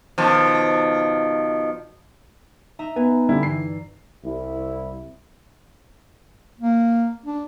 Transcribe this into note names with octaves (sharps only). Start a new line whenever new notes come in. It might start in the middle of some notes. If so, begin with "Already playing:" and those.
B2 D#3 F3
D#4 E5 A#5
B3 G#5
D3 G3 E4
G2 E3 C7
C2 E4
A#3
D4